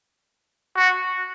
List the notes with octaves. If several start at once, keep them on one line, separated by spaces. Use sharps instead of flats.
F#4